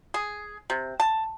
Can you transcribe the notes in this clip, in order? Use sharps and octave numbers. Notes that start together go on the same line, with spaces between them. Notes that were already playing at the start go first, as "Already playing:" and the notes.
G#4
C3
A5